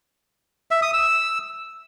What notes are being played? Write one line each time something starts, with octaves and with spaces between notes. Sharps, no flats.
E5
D#6
E6